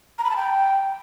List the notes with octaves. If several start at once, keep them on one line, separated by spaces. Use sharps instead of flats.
A#5
B5
A5
G5